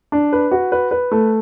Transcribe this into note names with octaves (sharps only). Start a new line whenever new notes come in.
D4
B4
F#4
B4
B4
A3